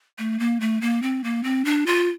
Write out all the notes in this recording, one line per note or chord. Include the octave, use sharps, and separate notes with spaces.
A3
A#3
A3
A#3
C4
A#3
C4
D4
F4